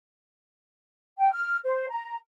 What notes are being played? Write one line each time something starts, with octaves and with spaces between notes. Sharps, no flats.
G5
F6
C5
A#5